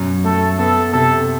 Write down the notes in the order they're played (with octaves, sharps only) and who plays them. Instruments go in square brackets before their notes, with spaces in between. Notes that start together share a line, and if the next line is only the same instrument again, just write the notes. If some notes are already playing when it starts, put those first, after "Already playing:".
Already playing: [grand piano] F#2 B2
[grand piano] A3 [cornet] A4
[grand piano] B3 [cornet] A4
[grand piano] C3 [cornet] A4